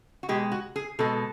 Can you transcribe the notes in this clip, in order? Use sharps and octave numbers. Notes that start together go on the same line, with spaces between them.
F#4
B2 G#3 G4
F#4
G#4
B2 G#3 A4